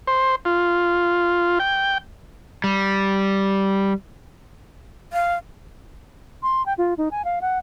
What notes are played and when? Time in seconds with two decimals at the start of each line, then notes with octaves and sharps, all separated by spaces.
0.07 C5
0.45 F4
1.60 G5
2.64 G3
5.13 F5
6.43 C6
6.66 G5
6.78 F4
6.98 D#4
7.11 G#5
7.25 F5
7.41 F#5